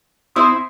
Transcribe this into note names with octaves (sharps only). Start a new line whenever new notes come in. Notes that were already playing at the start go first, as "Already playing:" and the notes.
C4 E4 C5 C6 D#6